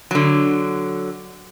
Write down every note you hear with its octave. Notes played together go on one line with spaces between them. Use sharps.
D3 F#3